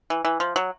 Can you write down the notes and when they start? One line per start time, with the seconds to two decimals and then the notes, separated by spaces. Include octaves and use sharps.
0.10 E3
0.25 E3
0.40 F3
0.56 F#3